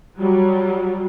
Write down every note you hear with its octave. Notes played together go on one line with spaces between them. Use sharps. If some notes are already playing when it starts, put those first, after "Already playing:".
F#3 G3